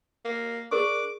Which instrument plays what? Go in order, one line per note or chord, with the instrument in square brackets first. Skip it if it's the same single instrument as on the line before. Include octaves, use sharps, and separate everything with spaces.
[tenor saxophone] A#3
[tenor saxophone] D4 [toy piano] G#4 A#4 C#6 [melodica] D6